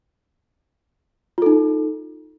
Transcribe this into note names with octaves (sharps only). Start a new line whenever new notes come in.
D#4 F4 A4